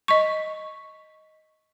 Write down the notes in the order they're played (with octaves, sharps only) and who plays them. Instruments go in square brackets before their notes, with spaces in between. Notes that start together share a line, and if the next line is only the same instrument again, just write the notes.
[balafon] D#5 C#6